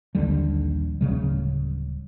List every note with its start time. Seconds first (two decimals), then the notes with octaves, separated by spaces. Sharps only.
0.15 A#1 D#2 D3 G3
1.01 D1 D#2 C#3 G3